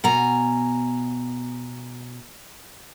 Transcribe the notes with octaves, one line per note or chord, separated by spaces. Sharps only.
B2 G#5 A#5